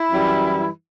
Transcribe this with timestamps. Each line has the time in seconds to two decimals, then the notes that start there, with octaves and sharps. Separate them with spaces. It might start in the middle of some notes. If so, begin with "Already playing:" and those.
Already playing: E4
0.12 F#2 E3 G3